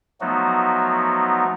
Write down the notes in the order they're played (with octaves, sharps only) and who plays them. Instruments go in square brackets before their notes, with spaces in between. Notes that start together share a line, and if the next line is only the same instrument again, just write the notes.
[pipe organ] F3 F#3 A3 B3 D#4 F#4